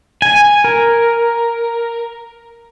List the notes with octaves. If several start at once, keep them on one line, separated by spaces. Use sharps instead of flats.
G#5
A#4